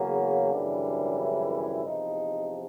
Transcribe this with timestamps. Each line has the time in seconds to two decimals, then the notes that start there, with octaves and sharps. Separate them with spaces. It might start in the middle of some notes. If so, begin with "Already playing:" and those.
Already playing: E2 C#3 F#3 A#3 C#4
0.52 G#1 F#2 C#3 E3 G3 D4
1.19 E4
1.86 E2 C3 F3 D#4